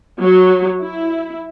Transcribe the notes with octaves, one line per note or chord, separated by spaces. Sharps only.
F#3
E4